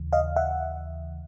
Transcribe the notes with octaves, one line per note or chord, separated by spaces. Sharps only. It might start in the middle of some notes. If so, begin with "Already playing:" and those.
Already playing: D#2 C#3 E3
D#5 F5
E5 F#5